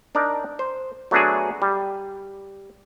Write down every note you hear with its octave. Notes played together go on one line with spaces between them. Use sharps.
D4 D#4 A#4 D5
C5
F#3 A3 B3 D4 F#4 G#4
G3